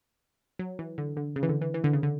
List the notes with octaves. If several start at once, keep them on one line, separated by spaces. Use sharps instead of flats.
F#3
E3
D3
D3
C#3
E3
D3
E3
E3
D3
C#3
D3